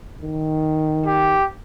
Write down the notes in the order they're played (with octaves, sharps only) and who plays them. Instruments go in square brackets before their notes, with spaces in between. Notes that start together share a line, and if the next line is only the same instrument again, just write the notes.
[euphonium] D#3
[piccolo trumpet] G4